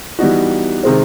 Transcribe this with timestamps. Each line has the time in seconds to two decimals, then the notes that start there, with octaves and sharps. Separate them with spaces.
0.19 E3 G3 B3 D#4 F#4
0.83 C3 D#3 G#3 C4